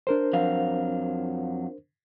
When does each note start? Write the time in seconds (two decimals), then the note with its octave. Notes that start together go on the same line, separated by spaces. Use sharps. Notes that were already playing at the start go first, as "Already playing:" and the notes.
0.07 D4 A#4 C5
0.33 F2 F#3 F5